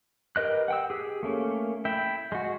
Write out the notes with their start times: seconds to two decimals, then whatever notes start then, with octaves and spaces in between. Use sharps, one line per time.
0.36 G4 A#4 B4 D#5 F#6
0.68 F#5 G5 E6
0.90 G4 G#4
1.23 A3 A#3 C#4
1.85 E4 E5 G5
2.32 G#3 F#4